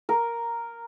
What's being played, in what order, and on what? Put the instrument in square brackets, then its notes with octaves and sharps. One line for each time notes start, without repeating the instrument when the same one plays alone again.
[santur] A#4